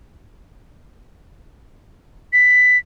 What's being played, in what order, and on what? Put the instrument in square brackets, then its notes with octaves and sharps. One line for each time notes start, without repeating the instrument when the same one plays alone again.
[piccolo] B6